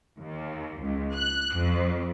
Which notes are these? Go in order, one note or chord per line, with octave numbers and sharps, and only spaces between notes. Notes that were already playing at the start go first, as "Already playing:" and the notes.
D#2
C#2
F#6
F2